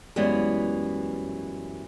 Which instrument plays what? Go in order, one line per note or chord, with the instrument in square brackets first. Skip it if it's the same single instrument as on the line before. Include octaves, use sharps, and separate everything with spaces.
[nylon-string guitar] F#2 E3 G3 G#3 B3